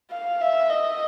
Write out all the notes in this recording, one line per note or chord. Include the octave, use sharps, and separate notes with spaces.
F5
E5
D#5